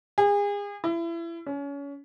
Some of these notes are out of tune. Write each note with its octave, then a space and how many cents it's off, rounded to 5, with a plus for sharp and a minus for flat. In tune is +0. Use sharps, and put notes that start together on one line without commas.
G#4 -35
E4 +30
C#4 +30